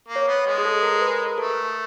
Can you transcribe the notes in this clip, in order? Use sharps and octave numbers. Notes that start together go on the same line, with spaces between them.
A#3
C#5
B3
G#3
G#4
A4
A#4
A#4
B4
A#4
A3 A4